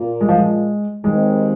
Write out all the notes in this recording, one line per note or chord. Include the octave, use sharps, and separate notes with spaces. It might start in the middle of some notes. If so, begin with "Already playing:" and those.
Already playing: A#2 A#3 F4
G#3
F3
G#3
D#2 D#3 G#3 C4